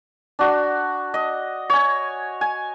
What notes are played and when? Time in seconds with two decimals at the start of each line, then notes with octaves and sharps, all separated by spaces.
0.39 D4 F#4
1.14 D#5
1.70 C#5 G#5
2.41 G#5